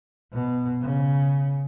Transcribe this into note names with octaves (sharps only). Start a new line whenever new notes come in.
B2
C#3